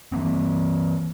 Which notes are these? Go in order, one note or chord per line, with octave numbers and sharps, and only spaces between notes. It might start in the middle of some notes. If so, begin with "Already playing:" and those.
E3 F3 A#3 C4